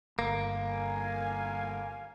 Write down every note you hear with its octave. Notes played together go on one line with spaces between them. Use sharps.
G1 A#3
F5 G#5